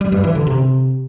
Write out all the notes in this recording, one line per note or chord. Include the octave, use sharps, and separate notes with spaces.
G3
G2
E3
D3
C3